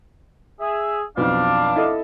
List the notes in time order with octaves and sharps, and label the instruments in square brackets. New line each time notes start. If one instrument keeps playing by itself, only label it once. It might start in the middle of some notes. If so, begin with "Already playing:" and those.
[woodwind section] G#4 E5
[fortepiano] B1 F2 [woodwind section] D4 F5
[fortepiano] E4 A4 D#5